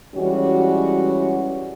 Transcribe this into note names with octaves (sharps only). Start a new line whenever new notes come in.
E3 G3 G#3 C#4 F#4